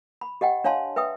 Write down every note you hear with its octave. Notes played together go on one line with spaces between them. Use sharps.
B5
G4 D#5 F#5 G5
D4 C#5 F5 A5 C6
B4 E5 G5 D#6